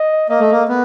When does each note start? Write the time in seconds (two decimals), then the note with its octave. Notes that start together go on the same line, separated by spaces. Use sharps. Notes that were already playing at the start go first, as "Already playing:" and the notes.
Already playing: D#5
0.29 A#3 D#5
0.40 A3
0.51 A#3
0.68 B3